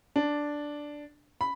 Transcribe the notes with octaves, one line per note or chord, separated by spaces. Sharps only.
D4
B5